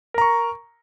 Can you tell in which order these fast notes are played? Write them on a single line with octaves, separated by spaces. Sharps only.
A#4 A#5 C#6